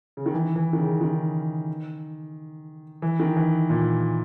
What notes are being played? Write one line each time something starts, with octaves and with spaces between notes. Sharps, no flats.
C#3
D#3
E3
E3
D#3
C#3
D#3
E3
D#3
E3
A#2